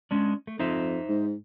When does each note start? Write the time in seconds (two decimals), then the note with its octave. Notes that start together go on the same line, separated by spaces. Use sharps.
0.11 G#3 C#4 D4
0.47 A3
0.59 F2 D#4 C5 E5
1.09 G#2